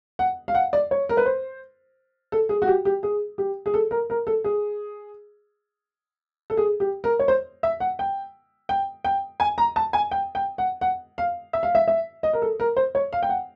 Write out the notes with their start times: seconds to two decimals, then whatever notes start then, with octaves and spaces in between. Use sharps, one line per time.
0.19 F#5
0.48 F5
0.55 F#5
0.73 D5
0.91 C#5
1.09 A#4
1.17 B4
1.26 C5
2.32 A4
2.49 G#4
2.62 F#4
2.68 G4
2.85 G4
3.03 G#4
3.38 G4
3.66 G#4
3.74 A4
3.91 A#4
4.10 A#4
4.27 A4
4.44 G#4
6.50 A4
6.57 G#4
6.80 G4
7.04 A#4
7.19 C#5
7.28 C5
7.63 E5
7.80 F#5
7.99 G5
8.69 G5
9.04 G5
9.40 G#5
9.58 A#5
9.76 A5
9.93 G#5
10.11 G5
10.35 G5
10.58 F#5
10.81 F#5
11.18 F5
11.53 E5
11.63 F5
11.75 E5
11.88 E5
12.23 D#5
12.33 A#4
12.42 A4
12.60 A#4
12.77 C5
12.95 C#5
13.13 F5
13.23 G5
13.29 F#5